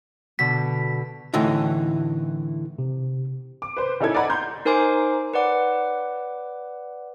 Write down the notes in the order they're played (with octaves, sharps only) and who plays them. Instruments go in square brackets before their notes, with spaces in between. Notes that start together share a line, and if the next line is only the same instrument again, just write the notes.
[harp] B2 D3 [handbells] B6
[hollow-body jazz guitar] A2 D3 E3 D#4
[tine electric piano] C3
[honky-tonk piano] D6
B4 C5
C#3 D#4 E4 A4 G#6
D5 D#5 F#5 A#5 B5
A#5 C6 G6
[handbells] D#4 A#4 C5 G#5 C6 D6
B4 C#5 D5 F#5 D6